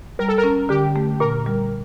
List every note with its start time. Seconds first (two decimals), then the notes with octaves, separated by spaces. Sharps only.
0.19 G3 A#4
0.28 A4
0.38 A#4
0.44 C#4
0.69 D3 G4
0.96 A3
1.20 A#2 A#4
1.46 G3